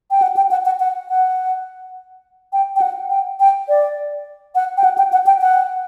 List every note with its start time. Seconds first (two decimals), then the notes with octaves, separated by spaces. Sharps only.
0.11 G5
0.22 F#5
0.37 G5
0.51 F#5
0.66 F#5
0.80 F#5
1.09 F#5
2.53 G5
2.76 G5
2.82 F#5
3.10 G5
3.40 G5
3.69 D5
4.55 F#5
4.77 G5
4.84 F#5
4.98 G5
5.13 F#5
5.26 G5
5.41 F#5